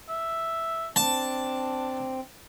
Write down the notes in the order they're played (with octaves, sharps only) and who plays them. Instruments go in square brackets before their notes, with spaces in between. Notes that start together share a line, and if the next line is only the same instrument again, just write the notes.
[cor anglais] E5
[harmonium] C4 [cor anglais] D4 [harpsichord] A5